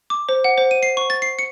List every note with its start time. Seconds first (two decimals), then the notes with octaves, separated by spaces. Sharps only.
0.10 D6
0.29 C5
0.44 F#5
0.58 C5
0.71 D#7
0.83 C7
0.97 C#6
1.10 A6
1.22 C7
1.39 C#7